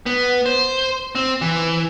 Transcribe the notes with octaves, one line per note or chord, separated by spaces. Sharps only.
B3
C5
C4
E3